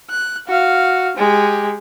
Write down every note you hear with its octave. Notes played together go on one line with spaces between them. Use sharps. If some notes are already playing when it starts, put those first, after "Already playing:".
F#6
F#4 F5
G#3 G4